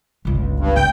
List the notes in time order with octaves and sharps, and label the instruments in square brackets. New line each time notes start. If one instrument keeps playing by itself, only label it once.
[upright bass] G1 C#2
[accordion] G2
[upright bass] C4 [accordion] G5